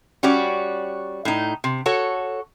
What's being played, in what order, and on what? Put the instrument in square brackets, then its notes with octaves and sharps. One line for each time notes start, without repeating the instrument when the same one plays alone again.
[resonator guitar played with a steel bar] G3 C#4 F#4 C#5 D5
A2 D#4
C3
F#4 A4 C#5